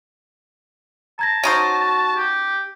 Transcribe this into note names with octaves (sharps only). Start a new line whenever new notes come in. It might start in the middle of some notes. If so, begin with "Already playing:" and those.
A5 A#5 G#6 A#6
C#4 D#4 F#4 C5 A#6 D7 D#7
G4